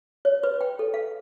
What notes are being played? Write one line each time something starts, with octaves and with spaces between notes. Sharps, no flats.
C#5
B4
G5
A4
F5